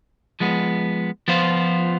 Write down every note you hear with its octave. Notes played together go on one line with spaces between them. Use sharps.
F3 G#3 B3
F3 B3 F4 C5